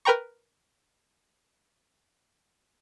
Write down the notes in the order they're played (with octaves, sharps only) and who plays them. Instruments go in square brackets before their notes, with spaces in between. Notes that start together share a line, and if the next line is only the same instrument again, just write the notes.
[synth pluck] A#4 B4 G5 A#5 C#6